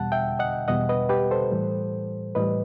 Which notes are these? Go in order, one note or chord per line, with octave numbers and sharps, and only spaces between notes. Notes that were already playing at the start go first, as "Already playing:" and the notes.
Already playing: E2 B2 G3 F#5 A5
E5 G5
D#5 F#5
E2 B2 G3 D#5 F#5
B4 D#5
G4 B4
A4 C5
A2 E3 G3
A2 E3 G3 B4 D#5